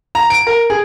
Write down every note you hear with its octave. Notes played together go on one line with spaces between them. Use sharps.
A#5
D7
A#4
G#4